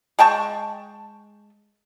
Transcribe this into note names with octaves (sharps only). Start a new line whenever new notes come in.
G#3 G5 A5 C#6